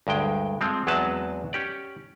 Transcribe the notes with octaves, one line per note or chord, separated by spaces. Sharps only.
D2 G2 G#3 G5
F3 G#3 C4
E2 F#3 G#3 C4 B4 A5
C#4 G4 D5